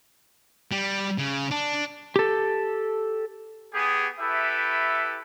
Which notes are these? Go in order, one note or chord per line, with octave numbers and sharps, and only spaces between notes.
G3
C#3
D4
G4 A4
B3 G4 G#4
E4 G4 A4 B4 E5